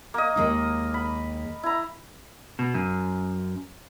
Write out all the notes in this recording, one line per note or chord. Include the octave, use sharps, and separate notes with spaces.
A#3 D#5
D#2 G#3 D#4
B5
E4 A#5
B2
F#2